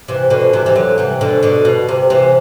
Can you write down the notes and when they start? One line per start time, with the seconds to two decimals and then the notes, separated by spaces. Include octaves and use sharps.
0.08 C3 E3
0.30 B2 D3
0.53 C3 E3
0.66 E3
0.75 D3 F#3
0.98 C3 E3
1.21 B2 D3
1.43 B2 D3
1.65 B2
1.88 C3
2.10 C3 E3